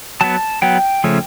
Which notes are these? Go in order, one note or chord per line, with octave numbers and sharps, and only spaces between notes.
F#3 B3 A5
F#3 B3 G5
C#3 F3 A3 C#4